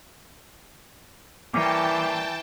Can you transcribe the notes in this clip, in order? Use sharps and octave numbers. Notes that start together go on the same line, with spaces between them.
E3 G3 A#3 C#4 G5 A5 D6